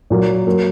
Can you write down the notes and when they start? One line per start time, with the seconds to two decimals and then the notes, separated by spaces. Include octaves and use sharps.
0.10 A#2 F#3 A#3
0.47 F#3 A#3